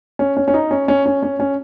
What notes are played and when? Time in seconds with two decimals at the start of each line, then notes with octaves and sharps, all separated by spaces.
0.19 C#4
0.37 C#4
0.48 C#4
0.54 D#4
0.71 C#4
0.88 C#4
1.06 C#4
1.23 C#4
1.40 C#4